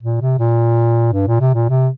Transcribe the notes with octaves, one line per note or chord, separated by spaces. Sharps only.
A#2
C3
A#2
G2
A#2
C3
A#2
C3